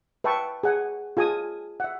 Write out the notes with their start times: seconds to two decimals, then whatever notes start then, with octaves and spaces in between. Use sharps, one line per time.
0.24 B4 E5 G5 A5 C#6
0.63 G#4 F#5 G#5
1.17 F4 G#4 G#5 A5 D#6
1.80 E5 F#5